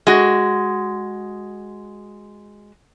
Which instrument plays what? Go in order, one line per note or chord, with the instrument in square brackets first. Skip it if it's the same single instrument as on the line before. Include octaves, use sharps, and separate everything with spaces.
[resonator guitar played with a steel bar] G#3 F#4